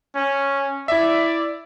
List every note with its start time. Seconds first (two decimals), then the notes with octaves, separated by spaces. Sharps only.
0.15 C#4
0.88 E4 D5 E5